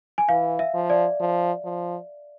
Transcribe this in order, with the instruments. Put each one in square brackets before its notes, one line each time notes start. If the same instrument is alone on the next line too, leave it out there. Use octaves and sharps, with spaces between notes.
[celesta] G#5
[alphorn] E3 [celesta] F5
[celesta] E5
[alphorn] F3
[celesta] D5
[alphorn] F3
F3